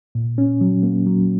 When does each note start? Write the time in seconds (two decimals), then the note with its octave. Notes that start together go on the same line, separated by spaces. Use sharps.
0.15 A#2
0.38 C#4
0.61 F#3
0.83 A#3
1.06 F#3